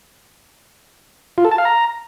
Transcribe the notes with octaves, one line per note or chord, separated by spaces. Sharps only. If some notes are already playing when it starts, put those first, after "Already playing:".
F4
A4
A5
F5
A#5